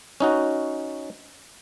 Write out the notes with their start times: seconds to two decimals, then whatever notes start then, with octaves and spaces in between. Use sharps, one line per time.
0.20 C#4 D#4 F#4